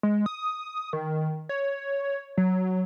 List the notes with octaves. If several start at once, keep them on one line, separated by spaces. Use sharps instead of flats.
G#3
D#6
D#3
C#5
F#3